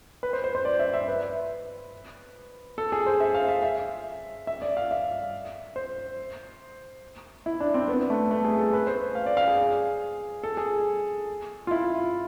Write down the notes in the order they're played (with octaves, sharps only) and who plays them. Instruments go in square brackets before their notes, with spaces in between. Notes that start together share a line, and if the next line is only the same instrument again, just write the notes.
[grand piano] B4
C5
C5
C5
D5
E5
E5
B4
A4
G#4
C5
E5
F5
E5
E5
E5
D5
F5
E5
C5
E4
D4
C4
B3
A3
A3
G#4
A4
B4
C5
F5
D5
F5
G#4
A4
G#4
F4
E4